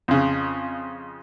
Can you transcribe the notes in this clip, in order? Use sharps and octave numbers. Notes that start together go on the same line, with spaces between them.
F2 C#3